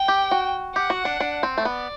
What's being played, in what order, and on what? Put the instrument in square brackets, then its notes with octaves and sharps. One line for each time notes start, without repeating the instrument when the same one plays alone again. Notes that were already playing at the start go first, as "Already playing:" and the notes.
Already playing: [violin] G5
[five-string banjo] G4
F#4
[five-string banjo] G4 [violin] F#5
[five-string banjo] F#4
D4
D4
C4
A3
[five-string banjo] B3 [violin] D5